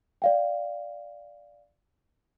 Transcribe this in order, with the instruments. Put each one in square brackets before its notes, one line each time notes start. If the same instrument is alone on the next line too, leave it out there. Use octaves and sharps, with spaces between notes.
[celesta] D5 F5 G5